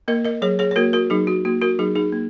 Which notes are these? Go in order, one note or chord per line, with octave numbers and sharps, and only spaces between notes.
A#3 A#4 D#5
A#4 D#5
F#3 G#4 C#5
G#4 C#5
C#5
A#3 F#4 A#4
F#4 A#4
F#3 D#4 G#4
F#4
A#3 F#4
F#4 A#4
F#3 D#4 G#4
D#4 G#4
A#3